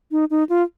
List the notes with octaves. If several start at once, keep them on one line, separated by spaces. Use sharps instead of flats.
D#4
D#4
F4